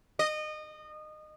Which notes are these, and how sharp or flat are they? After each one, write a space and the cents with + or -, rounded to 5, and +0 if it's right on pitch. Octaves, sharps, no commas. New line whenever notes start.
D#5 -25